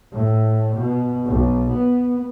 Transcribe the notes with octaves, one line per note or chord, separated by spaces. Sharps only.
A2
B2
B1
B3